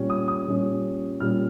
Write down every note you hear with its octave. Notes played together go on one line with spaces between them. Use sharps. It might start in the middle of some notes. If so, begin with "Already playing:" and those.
Already playing: A#2 G3 C#4
D#6
D#6
A#2 G3 C#4
A#2 G3 C#4 F6